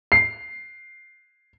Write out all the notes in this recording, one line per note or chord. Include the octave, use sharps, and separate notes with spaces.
C7